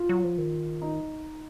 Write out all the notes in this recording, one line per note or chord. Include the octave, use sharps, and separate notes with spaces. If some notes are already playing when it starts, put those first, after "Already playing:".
Already playing: F4
F#3
F3
D#3
D#4